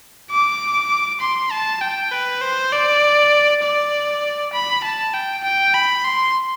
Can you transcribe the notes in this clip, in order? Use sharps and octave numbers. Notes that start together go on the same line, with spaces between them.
D6
C6
A5
G5
B4
C5
D5
D5
B5
A5
G5
G5
B5
C6